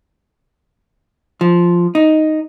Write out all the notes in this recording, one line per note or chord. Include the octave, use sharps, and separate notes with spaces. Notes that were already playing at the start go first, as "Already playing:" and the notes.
F3
D#4